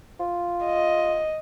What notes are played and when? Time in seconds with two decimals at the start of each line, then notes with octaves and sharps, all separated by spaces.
0.20 F4
0.65 D#5